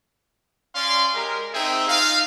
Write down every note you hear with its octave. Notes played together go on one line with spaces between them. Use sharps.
C#4 D5 F5 C6
G#3 G4 A#4
C4 D#4 G#4 E5 G5
D#4 F4 F5